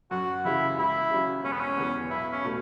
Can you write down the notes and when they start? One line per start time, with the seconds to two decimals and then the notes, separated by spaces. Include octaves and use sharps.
0.11 F#2 F#4
0.45 C#3 E3 E4
0.78 C#2 E4
1.10 C#3 F#3 C#4
1.44 E1 C#4
1.52 B3
1.60 C#4
1.77 E2 E3 B3
2.10 B1 E4
2.32 C#4
2.44 B2 A3